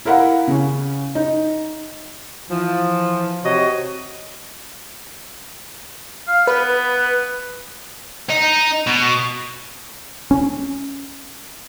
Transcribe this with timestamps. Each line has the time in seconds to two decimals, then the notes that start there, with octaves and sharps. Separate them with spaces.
0.05 E4 A#4 F5 F#5 B5
0.47 C#3 C#4
1.15 D#4
2.50 E3 F3
3.44 C3 F#4 C#5 D#5
6.27 F5
6.47 B3 B4
8.30 D#4
8.87 B2
10.31 C#4